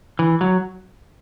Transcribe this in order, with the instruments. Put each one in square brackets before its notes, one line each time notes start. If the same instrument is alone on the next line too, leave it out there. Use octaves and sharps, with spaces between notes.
[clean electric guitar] E3
F#3